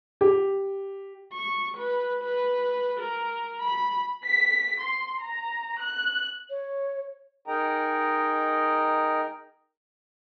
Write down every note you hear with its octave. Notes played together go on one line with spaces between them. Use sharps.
G4
C#6
B4
B4
A#4
B5
B6
C6
A#5
F#6
C#5
D#4 G#4 A#4 D#5 G5 A#5